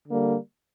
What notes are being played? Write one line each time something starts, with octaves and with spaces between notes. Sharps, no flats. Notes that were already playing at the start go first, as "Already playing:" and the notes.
D3 G3 A#3